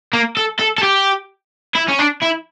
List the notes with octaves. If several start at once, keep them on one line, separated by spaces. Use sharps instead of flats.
A#3
A4
A4
A4
G4
E4
C#4
D4
E4